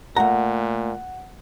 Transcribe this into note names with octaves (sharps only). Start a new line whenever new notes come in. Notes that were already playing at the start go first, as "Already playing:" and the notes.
A#2 A3 F#5 A#5